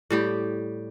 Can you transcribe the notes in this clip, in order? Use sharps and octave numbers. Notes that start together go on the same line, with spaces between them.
A2 G3 G4